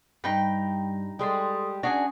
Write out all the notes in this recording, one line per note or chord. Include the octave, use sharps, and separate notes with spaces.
G2 G3 D#4 G5 B5
G3 G#3 A4 C6 D#6
C#4 D4 F#4 G#4 G#5